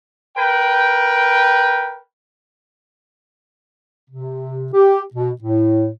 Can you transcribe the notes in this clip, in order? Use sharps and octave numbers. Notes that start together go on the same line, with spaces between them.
A#4 B4 G5
C3
G4
B2
A2